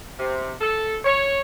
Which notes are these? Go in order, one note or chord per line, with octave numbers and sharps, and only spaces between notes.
C3
A4
C#5